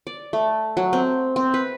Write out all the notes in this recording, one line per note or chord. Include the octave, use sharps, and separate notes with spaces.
D5
A3
F#3
C4
C4
B4